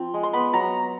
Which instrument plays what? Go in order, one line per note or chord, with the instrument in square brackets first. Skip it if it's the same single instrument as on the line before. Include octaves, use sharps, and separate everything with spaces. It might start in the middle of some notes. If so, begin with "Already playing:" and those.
Already playing: [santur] F3 C4 F4
G#3
C6
B3 B5
F#3 A#5